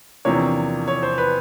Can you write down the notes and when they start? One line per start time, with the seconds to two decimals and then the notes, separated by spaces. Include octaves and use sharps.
0.25 E2 C3 F3 A#3 D4 C#5
0.88 C#5
1.03 C5
1.18 B4